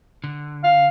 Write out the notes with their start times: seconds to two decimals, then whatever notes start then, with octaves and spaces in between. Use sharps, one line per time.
0.24 D3
0.64 F5